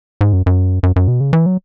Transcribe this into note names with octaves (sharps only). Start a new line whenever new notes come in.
G#2
F#2
F#2
F#2
F#2
B2
C#3
E3
F#3